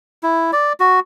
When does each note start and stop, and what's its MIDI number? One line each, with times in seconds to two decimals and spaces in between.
0.23 0.51 64
0.53 0.73 74
0.80 1.00 66